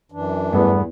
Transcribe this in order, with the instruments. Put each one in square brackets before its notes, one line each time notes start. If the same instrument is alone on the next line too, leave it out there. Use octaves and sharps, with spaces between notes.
[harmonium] F#2 E3 D4
[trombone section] E2 [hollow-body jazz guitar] G2 A3 [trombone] B3